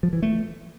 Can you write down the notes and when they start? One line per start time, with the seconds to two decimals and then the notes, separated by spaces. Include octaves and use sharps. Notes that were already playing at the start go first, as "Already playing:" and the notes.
0.03 F3
0.13 E3
0.22 A3